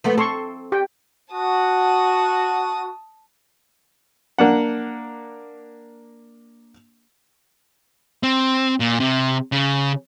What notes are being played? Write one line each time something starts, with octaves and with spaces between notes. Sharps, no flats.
F3 A3 B3
C4 A4 C6 C#6
G4 G5
F#4 A5 D#6
A#3 D4 F#5
C4
A#2
C3
C#3